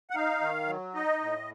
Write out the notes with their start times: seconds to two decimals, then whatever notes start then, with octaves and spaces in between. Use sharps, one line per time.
0.10 F#5
0.15 D#4 F5
0.41 D#3
0.67 F#3
0.95 D#4 D#5
1.21 A2